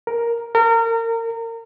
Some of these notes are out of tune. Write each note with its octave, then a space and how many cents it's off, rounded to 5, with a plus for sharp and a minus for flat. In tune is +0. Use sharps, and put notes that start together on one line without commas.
A#4 +5
A#4 -30